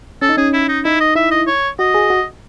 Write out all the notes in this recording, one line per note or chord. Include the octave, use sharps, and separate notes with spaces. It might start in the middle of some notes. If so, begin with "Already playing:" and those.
C#4 A4
D#4
C#4 G#4
E4
D#4
D#4 E4
D#5
E4 E5
D#5
C#5
F#4 D#5
G#4
F#4